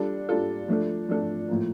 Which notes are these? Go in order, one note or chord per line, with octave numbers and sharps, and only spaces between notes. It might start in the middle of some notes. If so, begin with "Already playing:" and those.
Already playing: G3 D4 F4 A4
G3 D4 F4 A4
F3 A3 D4 A4
F3 A3 D4 A4
A2 F3 A#3